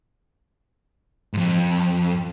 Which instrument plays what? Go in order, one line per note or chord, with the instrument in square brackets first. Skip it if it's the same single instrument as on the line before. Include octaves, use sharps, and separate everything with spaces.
[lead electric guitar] F2 G#2